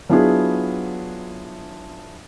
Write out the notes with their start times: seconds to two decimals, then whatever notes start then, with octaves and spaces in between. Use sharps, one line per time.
0.09 F#3 B3 D4 E4 F4 G#4